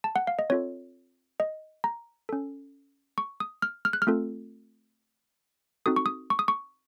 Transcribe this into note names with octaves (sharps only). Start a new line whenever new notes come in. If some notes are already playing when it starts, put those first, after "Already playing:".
A5
F#5
F5
D#5
C4 F4 A4 C#5
D#5
A#5
C#4 A4
C#6
D#6
F6
F6
F#6
F6
A3 C4 F4 A4
C4 D#4 F#4 A4 D#6
C#6
D#6
C#6
D#6
C#6